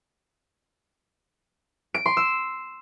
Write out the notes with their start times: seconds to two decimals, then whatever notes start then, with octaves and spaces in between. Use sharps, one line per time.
1.94 D7
2.06 C6
2.17 E6